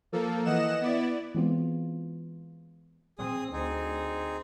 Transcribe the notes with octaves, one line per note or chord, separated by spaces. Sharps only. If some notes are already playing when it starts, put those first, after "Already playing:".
F3 A#3 A4
E3 D#5 F#5 E7
B3 E4 D5
E3 G#3 B3 C4 F4
C4 G#4 D#6
D2 C4 D#4 G#4